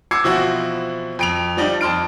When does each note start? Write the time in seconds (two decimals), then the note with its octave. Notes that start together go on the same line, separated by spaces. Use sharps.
0.11 D6 E6 G#6 C7 C#7
0.24 B2 E3 F3 C4 E4 F#4
1.19 F2 D7 F7
1.57 F3 G3 D4 D#4
1.81 F2 A5 C6 F6 D7